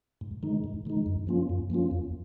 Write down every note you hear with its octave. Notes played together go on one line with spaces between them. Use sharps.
G#2
D#3 G#3 D#4
G#2
D#3 G#3 D#4
F#2
F3 A#3 C#4 F4
F#2
F3 A#3 C#4 F4
F2